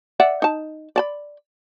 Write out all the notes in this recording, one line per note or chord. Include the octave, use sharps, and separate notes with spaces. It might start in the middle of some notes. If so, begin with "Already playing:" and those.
D5 E5 F#5
D#4 A5
D5 A5 B5